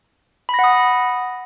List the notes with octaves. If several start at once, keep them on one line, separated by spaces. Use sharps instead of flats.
F#5 B5 D#6 A#6